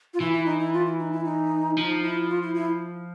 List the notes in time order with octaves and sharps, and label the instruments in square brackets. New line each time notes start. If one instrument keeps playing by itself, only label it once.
[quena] F4
[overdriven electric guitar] E3 [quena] E4
[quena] E4
D#4
E4
F4
E4
D#4
E4
D#4
[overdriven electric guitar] F3 [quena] D#4
[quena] E4
F4
E4
E4